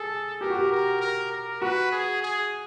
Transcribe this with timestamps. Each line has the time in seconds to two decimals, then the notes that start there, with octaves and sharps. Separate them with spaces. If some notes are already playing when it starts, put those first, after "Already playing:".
Already playing: G#4 A4
0.41 G4 A#4
0.50 F#4
0.59 G4
0.72 A#4
1.01 A#4
1.31 A#4
1.61 F#4 B4
1.92 G#4
2.22 G#4